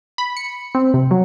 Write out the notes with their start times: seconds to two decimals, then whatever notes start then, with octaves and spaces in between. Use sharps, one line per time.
0.18 B5
0.37 C#7
0.75 C4
0.94 C3
1.11 F#3